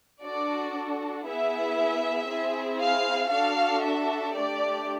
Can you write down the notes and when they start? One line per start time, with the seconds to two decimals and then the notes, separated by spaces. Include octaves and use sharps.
0.24 D4 F#4 A4 D5
1.27 B3 E4 G#4 E5
2.29 C4 E4 G#4
2.80 F5
3.31 D4 F#4 A4 F5
3.84 E5
4.34 A3 D4 G4 D5